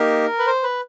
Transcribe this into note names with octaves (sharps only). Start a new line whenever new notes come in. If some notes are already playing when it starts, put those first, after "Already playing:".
Already playing: A#3 D#4 G4 A#4
B4
C5
B4